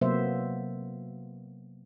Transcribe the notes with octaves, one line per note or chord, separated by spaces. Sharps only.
C3 F#3 A#3 B3 C5 E5